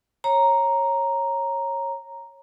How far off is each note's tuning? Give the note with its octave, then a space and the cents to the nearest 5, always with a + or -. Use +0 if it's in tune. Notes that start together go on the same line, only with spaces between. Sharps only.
C#5 -20 A#5 +0